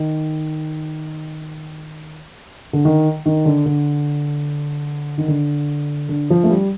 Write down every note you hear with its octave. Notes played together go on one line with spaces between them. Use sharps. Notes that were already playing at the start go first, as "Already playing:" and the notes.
Already playing: D#3
D3
D#3
D#3
D3
D3
D#3
D3
D3
F3
A3
G3